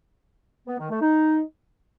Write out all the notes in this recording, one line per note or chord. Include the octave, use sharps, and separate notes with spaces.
B3
D#3
A3
D#4